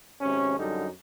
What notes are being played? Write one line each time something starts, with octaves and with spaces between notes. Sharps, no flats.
G#1 C3 C#4
F#2 D3 G3 D#4